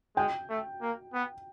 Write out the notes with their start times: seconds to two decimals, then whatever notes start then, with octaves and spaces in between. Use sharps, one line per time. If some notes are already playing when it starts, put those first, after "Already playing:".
0.16 G#3 G5
0.49 A3
0.81 A#3
1.13 B3